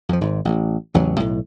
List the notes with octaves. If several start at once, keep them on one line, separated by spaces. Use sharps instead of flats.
F2 F3
G#1 G#2
A1
A1 E2 C#3 F#3
B1 A2